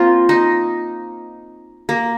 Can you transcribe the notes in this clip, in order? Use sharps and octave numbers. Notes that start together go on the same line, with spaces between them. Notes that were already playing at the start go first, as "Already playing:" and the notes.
Already playing: A#3 C4 F4
D#4
A#3